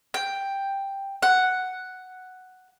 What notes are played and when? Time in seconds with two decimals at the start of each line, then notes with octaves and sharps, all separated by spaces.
0.14 G5
1.23 F#5